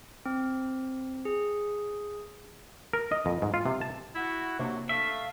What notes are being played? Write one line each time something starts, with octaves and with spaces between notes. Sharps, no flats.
C4
G#4
A#4
D#5
F2
G#2
F4
C3
A5
E4 F#4 F#5
C3 F#3 A#3 D4
A3 E5 F5